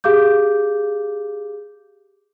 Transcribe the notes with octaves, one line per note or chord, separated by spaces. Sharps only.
G4 G#4 F5 D6 G6